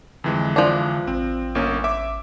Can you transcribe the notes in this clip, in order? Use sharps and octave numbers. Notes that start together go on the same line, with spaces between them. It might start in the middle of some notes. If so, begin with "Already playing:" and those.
F2 D3 E3 G#3
F3 D4
A1 C4
G1 A#3 C#4
E5 D6